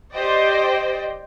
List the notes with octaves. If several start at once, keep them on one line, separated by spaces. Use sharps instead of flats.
G4 C5 D5 D#5 G5